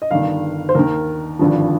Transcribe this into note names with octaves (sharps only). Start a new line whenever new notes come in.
D#5
G1 G2 D#3 F5
C5
D#2 D#3 A#4
G#1 G2 D3 F3